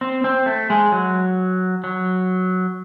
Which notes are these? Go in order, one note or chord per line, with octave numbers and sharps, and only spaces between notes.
C4
C4
A3
G#3
F#3
F#3